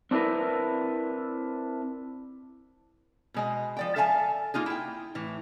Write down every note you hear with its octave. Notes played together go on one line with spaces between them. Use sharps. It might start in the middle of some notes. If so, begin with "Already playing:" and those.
C4 D4 E4 A#4 B4
B2 G#3 D#5
F3 D5 G5
A4 E5 F5 G#5 A5
A#3 D#4 F4 G#4
E4 G5
A2 E3